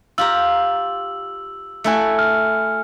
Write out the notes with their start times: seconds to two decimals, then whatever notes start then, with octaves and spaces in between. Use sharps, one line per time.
0.18 F4 G4 A#5 E6 F#7
1.84 A3 E4 F#4 G#5 C#7
2.19 F6